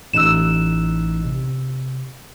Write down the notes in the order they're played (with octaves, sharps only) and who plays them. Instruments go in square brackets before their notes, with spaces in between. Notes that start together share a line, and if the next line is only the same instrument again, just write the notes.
[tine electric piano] A1 D#4 F#6 [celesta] E6 E7
[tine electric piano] C3